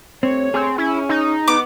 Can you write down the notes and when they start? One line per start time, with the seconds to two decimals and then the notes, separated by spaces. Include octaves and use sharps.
0.23 G2 A3 C4 C#5
0.54 C4 G#4
0.78 C#4 E4
1.09 D#4
1.48 B3 D6